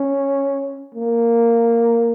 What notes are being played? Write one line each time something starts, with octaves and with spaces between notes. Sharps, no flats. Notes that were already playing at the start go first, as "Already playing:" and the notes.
Already playing: C#4
A#3